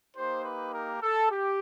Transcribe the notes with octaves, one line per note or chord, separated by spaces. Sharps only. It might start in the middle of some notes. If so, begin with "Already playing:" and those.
A#3 D#4 G4 C5
B4
A#4
A4
G4